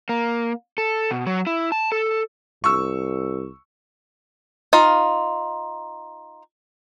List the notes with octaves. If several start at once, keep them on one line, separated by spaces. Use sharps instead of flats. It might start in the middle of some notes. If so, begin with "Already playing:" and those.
A#3
A4
B2
F#3
E4
A5
A4
C2 C#6 E6
D#4 F4 F5